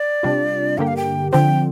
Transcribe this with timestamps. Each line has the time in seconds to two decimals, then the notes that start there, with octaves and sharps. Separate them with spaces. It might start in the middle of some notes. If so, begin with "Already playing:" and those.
Already playing: D5
0.23 C3 G3 D4 F4
0.78 G2 D3 A#3 G4 G5
0.87 F5
0.97 G5
1.32 D3 F3 C4 G5